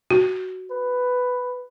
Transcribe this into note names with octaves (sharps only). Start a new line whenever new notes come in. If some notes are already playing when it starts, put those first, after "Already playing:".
F#4
B4